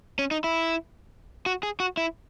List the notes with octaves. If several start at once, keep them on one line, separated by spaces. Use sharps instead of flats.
C#4
D#4
E4
F#4
G#4
F#4
E4